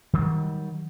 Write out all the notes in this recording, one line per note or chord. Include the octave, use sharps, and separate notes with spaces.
D#3 F#3 G3